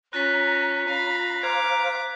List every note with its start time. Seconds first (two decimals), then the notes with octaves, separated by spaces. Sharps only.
0.13 C#4 F4 A#5 F#6 A6 B6
0.88 F5 B5
1.43 C5 F5 A#5 D6 G#6 F7